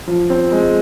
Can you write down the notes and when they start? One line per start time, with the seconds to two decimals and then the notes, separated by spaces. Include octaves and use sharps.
0.07 F3
0.30 C4
0.52 G#3